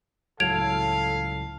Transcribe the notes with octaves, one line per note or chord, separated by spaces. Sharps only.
C#2 A2 F#3 A4 F5 G#6 D7 F7